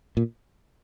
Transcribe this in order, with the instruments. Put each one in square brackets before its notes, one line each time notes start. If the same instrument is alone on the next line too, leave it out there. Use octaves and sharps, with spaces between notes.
[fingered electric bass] A#2